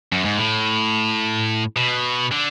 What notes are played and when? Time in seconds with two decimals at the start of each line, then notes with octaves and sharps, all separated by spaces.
0.12 F#2
0.25 G#2
0.38 A2
1.76 B2
2.31 D3